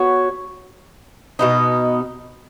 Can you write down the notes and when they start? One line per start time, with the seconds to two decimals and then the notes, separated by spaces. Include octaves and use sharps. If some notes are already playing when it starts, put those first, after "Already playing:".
Already playing: B3 F#4 C#5
1.39 B2 B3 D#4